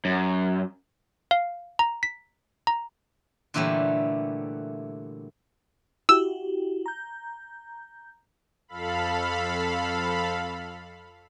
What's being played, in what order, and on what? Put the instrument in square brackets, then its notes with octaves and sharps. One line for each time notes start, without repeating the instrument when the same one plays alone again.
[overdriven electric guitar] F#2
[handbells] F5
A#5
B6
A#5
[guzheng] A#2 D3 E3 F#3 G3 A3
[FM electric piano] E4 F#4 G4 [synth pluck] E6
[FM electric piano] A#5 G6
[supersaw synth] F2 A4 F5 B5